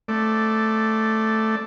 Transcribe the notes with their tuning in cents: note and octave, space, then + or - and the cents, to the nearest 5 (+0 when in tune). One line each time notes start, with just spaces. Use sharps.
A3 +0 C4 +5 D5 +0